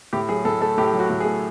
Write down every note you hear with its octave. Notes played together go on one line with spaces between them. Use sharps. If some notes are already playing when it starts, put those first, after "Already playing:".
A2 G4
F#3 G#4
A2 A4
A3 A4
A2 G4
F#3
F#4
A2
G#4
A3